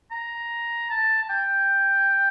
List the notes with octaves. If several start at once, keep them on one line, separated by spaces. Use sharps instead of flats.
A#5
A5
A5
G5